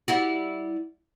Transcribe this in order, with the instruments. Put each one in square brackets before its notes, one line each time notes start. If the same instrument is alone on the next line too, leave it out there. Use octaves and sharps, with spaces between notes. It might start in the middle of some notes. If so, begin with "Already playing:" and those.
[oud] G3 E4 F#4